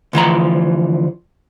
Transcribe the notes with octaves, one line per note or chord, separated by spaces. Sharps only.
D2 E3 F3 A#5